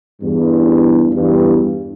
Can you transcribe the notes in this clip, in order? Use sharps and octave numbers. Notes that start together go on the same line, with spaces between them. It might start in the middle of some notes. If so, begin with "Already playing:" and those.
E2 G2
E2 G2